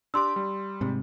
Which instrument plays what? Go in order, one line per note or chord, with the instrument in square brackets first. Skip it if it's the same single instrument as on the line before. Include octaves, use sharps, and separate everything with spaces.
[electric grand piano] D4 G4 D6 [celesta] C6 E6
[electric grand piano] G3
[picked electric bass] G#2 C3